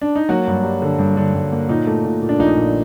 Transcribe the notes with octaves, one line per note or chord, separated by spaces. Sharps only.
D4
D#4
F#3 A#3 F#4
G2
G3
D3
G2
D3
G2
A#3
A#2 D#4
A3
A#2
A#2
D4
A#1 D#4
A#2